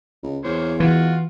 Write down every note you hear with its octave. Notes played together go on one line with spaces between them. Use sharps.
C#2
E2 A#3 C5 C#5
E3 F4 F#4